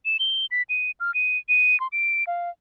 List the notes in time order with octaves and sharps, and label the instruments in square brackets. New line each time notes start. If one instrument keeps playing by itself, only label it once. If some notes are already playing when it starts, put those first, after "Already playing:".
[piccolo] E7
G7
B6
D#7
F6
D#7
D#7
C6
D7
F5